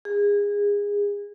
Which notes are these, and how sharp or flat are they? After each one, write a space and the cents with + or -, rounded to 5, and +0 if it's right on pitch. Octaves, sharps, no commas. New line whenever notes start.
G#4 -25